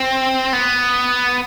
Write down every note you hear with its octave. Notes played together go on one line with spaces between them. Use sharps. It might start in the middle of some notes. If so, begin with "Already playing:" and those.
Already playing: C4
B3